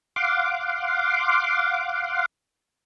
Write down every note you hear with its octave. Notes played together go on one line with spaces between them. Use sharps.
F5 F#5 C6 D6